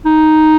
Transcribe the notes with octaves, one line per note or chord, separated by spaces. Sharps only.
D#4